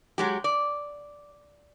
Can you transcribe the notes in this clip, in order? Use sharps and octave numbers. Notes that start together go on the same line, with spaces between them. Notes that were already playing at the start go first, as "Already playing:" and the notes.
F#3 G#3 G4
D5